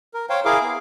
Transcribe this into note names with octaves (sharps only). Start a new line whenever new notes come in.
A#4
C5 C#5 F5 G5
E4 G#4 A#4 F5 D6
B3